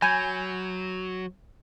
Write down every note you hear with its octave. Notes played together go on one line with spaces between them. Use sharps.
F#3 G#5 B5 G6 G#6